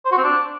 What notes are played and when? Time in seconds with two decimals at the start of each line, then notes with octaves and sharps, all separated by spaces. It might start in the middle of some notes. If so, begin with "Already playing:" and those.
0.05 C5
0.12 F#4
0.18 C4
0.24 D4